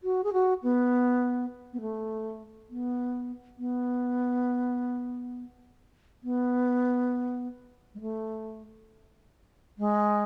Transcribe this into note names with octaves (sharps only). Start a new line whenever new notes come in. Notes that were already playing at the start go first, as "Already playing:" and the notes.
F#4
G#4
F#4
B3
B3
A3
B3
B3
B3
G#3
A3
G#3